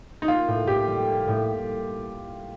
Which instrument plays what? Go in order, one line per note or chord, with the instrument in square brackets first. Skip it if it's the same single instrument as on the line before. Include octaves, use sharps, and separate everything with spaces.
[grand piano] D#4
[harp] A#3 [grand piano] F4
[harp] A2
[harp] A2 [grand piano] G4
[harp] G3
A#3
A2